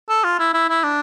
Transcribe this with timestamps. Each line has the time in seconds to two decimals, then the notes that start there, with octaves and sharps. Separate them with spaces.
0.09 A4
0.24 F4
0.39 E4
0.54 E4
0.69 E4
0.84 D4